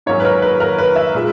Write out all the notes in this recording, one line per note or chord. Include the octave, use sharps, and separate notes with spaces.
G#2 F#3 A#3 C#4 C#5
B4
A#4
B4
A#4
B4
E5
A#2 G#3